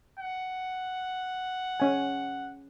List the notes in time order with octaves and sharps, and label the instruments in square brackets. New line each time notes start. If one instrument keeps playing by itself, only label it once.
[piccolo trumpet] F#5
[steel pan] C#4 G#5